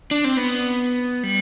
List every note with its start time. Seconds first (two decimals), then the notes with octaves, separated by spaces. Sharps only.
0.11 D4
0.24 C4
0.37 B3
1.23 G3